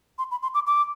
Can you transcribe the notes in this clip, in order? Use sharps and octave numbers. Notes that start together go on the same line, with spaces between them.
C6
B5
C6
D6
D6